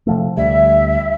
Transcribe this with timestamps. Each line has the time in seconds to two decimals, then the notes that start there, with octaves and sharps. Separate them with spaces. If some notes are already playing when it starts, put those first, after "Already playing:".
0.07 C3 F3 A3
0.37 D2 G3 E5